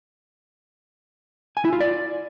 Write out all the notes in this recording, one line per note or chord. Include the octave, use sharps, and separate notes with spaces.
G#5
E4
F4
D5